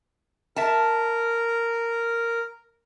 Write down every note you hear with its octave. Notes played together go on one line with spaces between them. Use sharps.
A#4 E5 A5